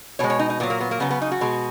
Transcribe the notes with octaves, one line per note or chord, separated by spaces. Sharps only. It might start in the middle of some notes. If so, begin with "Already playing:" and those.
B2 G#3 C#5
C#5
D#4
D#4
A#2 F#3 B3
A#3
B3
A#3
C#3 F#3 B3
B3
D#4
F#4
B2 G#3